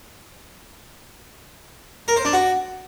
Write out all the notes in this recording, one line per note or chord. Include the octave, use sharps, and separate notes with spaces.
A#4
C5
D4
F#4